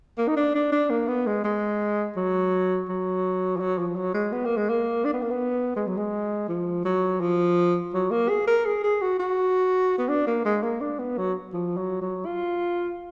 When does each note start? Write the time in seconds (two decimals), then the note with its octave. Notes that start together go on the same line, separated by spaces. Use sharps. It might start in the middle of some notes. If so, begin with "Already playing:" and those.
0.18 A#3
0.28 D#4
0.37 D4
0.55 D4
0.72 D4
0.90 A#3
1.08 B3
1.27 G#3
1.44 G#3
2.17 F#3
2.89 F#3
3.57 F3
3.60 F#3
3.79 F3
3.96 F#3
4.14 G#3
4.32 B3
4.45 A#3
4.57 G#3
4.70 A#3
5.05 D4
5.14 B3
5.22 A#3
5.31 B3
5.76 G#3
5.87 F#3
5.97 G#3
6.49 F3
6.85 F#3
7.21 F3
7.94 F#3
8.11 A#3
8.29 G#4
8.48 A#4
8.65 G#4
8.84 G#4
9.02 F#4
9.20 F#4
9.99 B3
10.09 D4
10.27 A#3
10.46 G#3
10.63 A#3
10.81 D4
10.99 B3
11.18 F#3
11.54 F3
11.77 F#3
12.02 F#3
12.26 F4